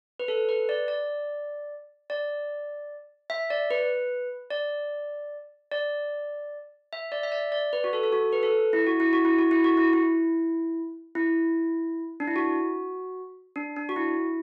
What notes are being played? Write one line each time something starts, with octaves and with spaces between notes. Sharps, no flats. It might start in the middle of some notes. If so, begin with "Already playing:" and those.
B4
A4
B4
D5
D5
D5
E5
D5
B4
D5
D5
E5
D5
E5
D5
D5
B4
F#4
A4
A4
F#4
B4
A4
E4
F#4
E4
F#4
E4
F#4
E4
F#4
E4
E4
E4
D4
E4
F#4
D4
D4
F#4
E4